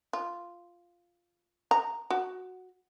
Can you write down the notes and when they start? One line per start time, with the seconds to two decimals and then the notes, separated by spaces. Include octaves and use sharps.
0.13 F4
1.71 A#5
2.10 F#4